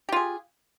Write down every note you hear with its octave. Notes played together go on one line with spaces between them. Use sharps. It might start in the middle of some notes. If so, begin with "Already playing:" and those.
F4 G4 G#4